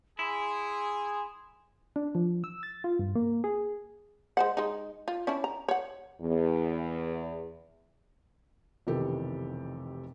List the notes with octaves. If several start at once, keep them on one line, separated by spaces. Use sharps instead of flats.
E4 G#4 C6
D4
F3
E6
A6
F4
G2
A#3
G#4
G#3 C5 F#5
G#3 D#4
F4
C#4 D4 E4
A#5
C#5 F#5
E2
F1 B2 D#3 E3 G4 A4